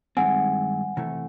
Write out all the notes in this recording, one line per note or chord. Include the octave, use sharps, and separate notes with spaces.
G2 D#3 G#3 C4 F#5 G#5
C3 E3 A3